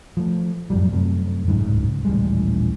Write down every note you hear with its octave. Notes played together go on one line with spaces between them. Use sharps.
F3 A3
F#2 A2 F3 G3
F#2 C3 A3
D1 C#2 G#2
D#1 A1 G3 G#3